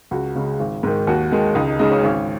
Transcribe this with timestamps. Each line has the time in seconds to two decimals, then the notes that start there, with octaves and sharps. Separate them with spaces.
0.11 C#2 F#4
0.36 C#3 G#3
0.59 G#1
0.83 G#2 D#3
1.07 D#2 F#4
1.32 D#3 G#3
1.55 C#2 D#4
1.68 D#4
1.79 C#3 G#3 D#4
1.91 C#4
2.03 G#1 C#4